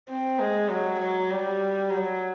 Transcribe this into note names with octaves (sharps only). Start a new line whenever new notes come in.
C4
G#3
F#3
F#3
G3
F#3